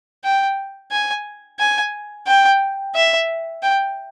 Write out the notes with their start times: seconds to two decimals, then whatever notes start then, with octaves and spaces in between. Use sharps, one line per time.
0.24 G5
0.92 G#5
1.59 G#5
2.27 G5
2.95 E5
3.63 G5